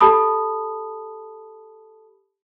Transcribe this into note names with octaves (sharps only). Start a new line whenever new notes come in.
G4 A4 A5 B5 D#6